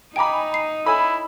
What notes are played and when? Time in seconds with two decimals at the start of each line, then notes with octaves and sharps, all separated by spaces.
0.16 D#4 G5 G#5 A#5 B5 D6
0.54 C7
0.86 E4 A4 C#5 G#5 B5